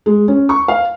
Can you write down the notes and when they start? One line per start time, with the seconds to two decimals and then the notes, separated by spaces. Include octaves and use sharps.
0.06 G#3
0.28 C#4
0.49 C#6
0.68 F5